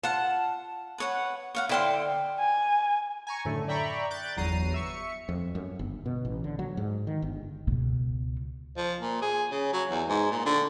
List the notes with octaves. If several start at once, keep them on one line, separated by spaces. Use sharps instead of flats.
F4 F#5 A5
B4 C#5 F#5
C#5 F5 F#5
D3 E4 C5 F5 G5
G#5
G#5 A#5 C#6
F#2 A2 D3 A3
D5 E5 G5 A#5 B5 C#6
F#6 G6 A6 D7
G1 E2 F#3 A#5 C7 D#7
E5 C#6 C#7
F2
F#2
G1
B2
A1
D3
F#3
G#2
D#3
G1
C#2 B2
F3
A#2
G#4
C#3
F#3
E2
G#2
A#2
D3